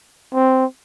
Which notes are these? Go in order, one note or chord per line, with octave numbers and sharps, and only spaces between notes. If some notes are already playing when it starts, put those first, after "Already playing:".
C4